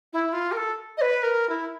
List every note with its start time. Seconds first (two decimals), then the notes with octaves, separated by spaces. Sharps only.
0.13 E4
0.33 F4
0.52 A#4
0.57 A4
0.97 D#5
1.01 B4
1.23 A#4
1.49 E4